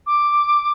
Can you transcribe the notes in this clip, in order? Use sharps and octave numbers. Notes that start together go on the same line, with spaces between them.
D6